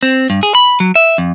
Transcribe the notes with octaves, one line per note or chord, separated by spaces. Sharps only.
C4
G2
G#4
B5
F#3
E5
F2